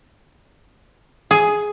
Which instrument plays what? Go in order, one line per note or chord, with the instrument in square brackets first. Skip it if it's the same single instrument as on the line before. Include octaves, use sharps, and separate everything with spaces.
[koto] G#4